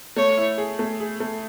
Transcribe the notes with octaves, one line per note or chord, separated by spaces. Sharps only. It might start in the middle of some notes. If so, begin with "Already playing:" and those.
A3 C#5
E4
G#4
A3
G#4
A3